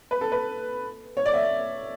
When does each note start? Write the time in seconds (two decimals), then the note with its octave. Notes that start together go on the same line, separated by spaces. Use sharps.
0.11 B4
0.21 A4
0.32 B4
1.17 C#5
1.26 D5
1.34 E5